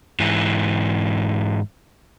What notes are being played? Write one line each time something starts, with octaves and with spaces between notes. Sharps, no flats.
G#2 E3